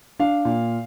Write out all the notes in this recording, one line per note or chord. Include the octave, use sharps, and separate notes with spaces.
D4 F5
A#2